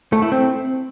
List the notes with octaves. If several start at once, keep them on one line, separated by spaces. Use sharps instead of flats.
A3
E4
C4